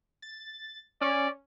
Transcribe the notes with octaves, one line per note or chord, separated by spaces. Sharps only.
A6
C#4 D5